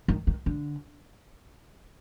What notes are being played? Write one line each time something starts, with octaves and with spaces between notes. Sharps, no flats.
D#3
D#3
D3